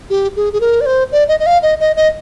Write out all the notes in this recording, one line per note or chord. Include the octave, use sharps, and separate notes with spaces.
G4
G#4
G#4
A#4
D5
C5
D5
D#5
D#5
F5
D#5
D#5
D#5